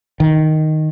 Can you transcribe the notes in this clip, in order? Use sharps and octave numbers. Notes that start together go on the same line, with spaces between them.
D#3